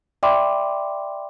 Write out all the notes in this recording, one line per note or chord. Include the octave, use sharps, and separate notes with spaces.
D5 E5 G5 B5 C6 D6